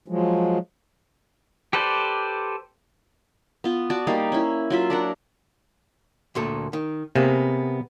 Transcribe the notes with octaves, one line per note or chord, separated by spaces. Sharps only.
F3 F#3 G#3
G4 A4 B4 C5 D5
B3 F4
F#4 D5 A5 D6
G3 A#3 D#4 F5
C#4 E4
F#3 F4 E5
D4 A#4 F#5
D2 A#2 A4
D#3
C3 A#3 B3 G#4